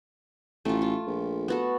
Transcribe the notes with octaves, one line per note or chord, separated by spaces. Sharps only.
A1 A3 F4
F4
A#1
B3 F#4 A4